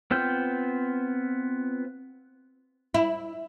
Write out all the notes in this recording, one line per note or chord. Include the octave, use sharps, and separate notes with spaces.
B3 C4 F4 G5
E4